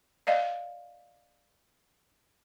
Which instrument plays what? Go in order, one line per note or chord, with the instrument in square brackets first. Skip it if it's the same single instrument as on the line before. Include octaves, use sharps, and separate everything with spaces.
[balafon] D5 D#5 F5